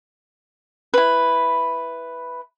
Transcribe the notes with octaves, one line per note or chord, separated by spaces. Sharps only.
E4 B4